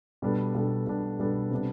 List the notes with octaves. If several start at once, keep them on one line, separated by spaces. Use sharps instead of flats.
B2 G3 B3 D4 A4
B2 G3 B3 D4 A4
B2 G3 B3 D4 A4
B2 G3 B3 D4 A4
C3 G3 B3 D4